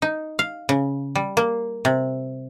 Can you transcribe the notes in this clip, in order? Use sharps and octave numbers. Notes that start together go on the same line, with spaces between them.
D#4
F5
C#3
G3
A#3
C3